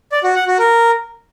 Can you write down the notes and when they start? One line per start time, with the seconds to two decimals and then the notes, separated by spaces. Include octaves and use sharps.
0.12 D5
0.24 F#4
0.35 F#5
0.47 F#4
0.59 A#4